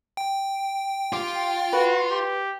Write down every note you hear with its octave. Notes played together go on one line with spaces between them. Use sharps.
G5
F4 G4
F#4 B4
G4